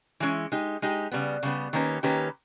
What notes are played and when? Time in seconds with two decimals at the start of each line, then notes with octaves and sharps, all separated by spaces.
0.20 E3 G#3 C#4 E4
0.52 G#3 D#4 G4
0.82 G#3 D#4 G4
1.12 C#3 G3 B3
1.43 C#3 G3 B3
1.73 D#3 A#3 C#4 G4 B4
2.03 D#3 A#3 C#4 G4 B4